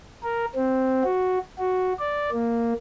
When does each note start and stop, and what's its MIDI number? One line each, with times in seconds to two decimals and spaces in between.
0.23 0.45 70
0.55 1.03 60
1.04 1.38 66
1.58 1.93 66
1.99 2.30 74
2.32 2.73 58